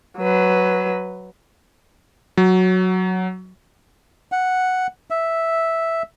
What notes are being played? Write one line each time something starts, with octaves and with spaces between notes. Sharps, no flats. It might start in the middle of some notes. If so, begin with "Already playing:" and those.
F#3 B4
F#3
F#5
E5